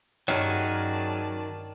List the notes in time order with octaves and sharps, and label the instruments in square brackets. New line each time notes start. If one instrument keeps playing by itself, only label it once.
[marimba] G2 C#5 [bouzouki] D#3 [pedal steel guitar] F#3 C#4 G#4 [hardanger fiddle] D5 A5